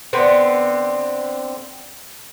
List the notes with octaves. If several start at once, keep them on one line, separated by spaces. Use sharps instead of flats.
D3 B3 C4